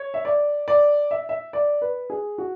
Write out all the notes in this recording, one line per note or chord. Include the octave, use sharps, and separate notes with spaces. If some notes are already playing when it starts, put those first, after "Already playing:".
Already playing: C#5
E5
D5
D5
E5
E5
D5
B4
G#4
F#4